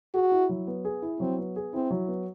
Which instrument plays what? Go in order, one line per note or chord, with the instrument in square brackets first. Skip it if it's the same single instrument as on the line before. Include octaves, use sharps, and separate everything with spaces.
[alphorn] F#4 [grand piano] G#4
[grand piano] E4
F#3
B3
G#4
E4
[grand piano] F#3 [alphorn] C4
[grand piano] B3
G#4
[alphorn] C4 [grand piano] E4
[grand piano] F#3
B3